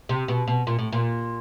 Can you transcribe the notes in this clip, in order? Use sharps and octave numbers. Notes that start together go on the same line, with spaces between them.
C3
B2
B2
A#2
A2
A#2